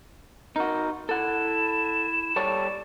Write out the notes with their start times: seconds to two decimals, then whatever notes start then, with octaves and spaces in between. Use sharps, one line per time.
0.56 D#4 F#4 A#4
1.09 E4 A4 F#5 E7
2.36 G3 A4 C#5 D5